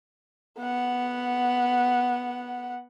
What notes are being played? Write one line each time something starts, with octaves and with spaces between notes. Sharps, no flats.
B3 F#5